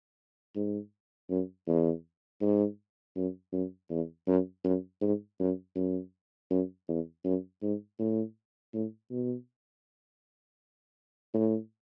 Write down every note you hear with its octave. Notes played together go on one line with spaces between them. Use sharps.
G#2
F#2
E2
G#2
F#2
F#2
E2
F#2
F#2
G#2
F#2
F#2
F#2
E2
F#2
G#2
A2
A2
B2
A2